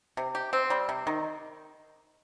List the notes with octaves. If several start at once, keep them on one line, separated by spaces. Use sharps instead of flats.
C3
G4
C4
G3
C3
D#3